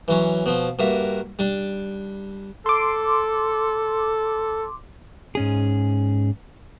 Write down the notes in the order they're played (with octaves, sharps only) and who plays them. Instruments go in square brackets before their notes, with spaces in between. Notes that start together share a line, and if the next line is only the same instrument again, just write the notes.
[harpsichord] E3 F#3 C#4
B2 F3
G2 A#3 F#4 E5
G3 D4
[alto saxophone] A4 [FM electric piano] C6 D6
[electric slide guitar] G#2 C#4 G#4